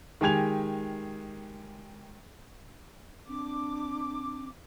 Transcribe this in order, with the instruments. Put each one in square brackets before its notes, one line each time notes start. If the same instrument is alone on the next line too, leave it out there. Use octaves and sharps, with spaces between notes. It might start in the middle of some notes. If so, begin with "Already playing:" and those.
[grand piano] D#3 G#3 G4 G#5 G#6 F7
[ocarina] C4 [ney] D4 [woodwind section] D6